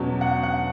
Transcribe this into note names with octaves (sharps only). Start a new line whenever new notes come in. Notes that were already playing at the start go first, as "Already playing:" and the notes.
Already playing: E2 B2 F#3 C#4
F#5
F#5